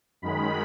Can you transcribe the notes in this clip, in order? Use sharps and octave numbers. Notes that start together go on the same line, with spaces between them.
F#2 D#3 G#3 B5